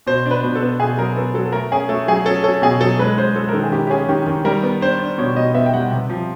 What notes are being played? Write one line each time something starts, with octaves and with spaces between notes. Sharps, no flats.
B2 C5
D4
B4
B2
A4
B3
B2 G#4
F#3 A#4
B3 A4
F#3 A4
A4
A3 A#4
C#4 G#4
A3 A4
F#3 G#4
C#4 A4
C#4 A4
B2 G#4
F#3 A4
G#3 B4
G#3 C5
G#3 A4
A#4
D#3 A4
G#4
D#3 G4
G4
C#4 G#4
D#3 G4
D#3
G3 A#4
B3
D4 C5
D4
B2 C#5
B2 D#5
B3 E5
G5
G3 F#5
C3
F3